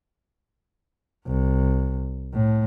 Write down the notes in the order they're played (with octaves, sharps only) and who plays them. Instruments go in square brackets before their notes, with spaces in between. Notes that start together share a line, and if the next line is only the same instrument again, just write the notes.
[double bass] C2
A2